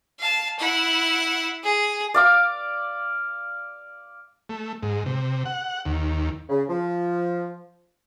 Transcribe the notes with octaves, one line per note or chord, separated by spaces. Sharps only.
F5 A5
E4 F#5
G#4
D5 F5 D6
A3
G#2
C3
F#5
D#2
C#3
F3